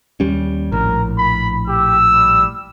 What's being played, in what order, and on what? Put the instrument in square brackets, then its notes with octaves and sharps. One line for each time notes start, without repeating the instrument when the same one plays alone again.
[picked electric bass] D#2 G3 C#4
[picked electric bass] A#1 A2 [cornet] A#4
[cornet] B5
[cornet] G4 [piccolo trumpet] E6
[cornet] G3